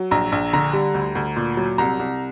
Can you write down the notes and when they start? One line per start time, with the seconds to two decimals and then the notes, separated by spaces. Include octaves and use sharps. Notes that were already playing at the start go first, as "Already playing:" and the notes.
Already playing: F#3
0.11 A#1 A#5
0.32 A#1
0.53 D3 A#5
0.73 G3
0.94 D2
1.15 D2
1.36 A#2
1.57 F#3
1.78 C2 A#5
1.99 C2